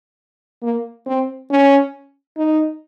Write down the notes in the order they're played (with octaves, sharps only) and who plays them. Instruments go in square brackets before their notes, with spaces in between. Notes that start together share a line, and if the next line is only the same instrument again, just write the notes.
[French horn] A#3
C4
C#4
D#4